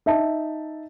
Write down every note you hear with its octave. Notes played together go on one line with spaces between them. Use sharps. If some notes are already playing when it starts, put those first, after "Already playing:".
D#4 E5 A5